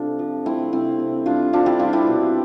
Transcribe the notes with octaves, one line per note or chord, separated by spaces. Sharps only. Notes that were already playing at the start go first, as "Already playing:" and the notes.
Already playing: C3 G3 D4 F4 A4
F3
A3 C4 E4
C3 C4 E4
C3
G3 D4 F4
C3 D4 F4
E4 G4
G3 D4 F4
C4 E4
B2